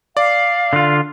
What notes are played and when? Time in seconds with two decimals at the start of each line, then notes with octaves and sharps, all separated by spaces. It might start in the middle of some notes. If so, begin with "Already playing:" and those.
0.17 D5 F5
0.73 D3 F4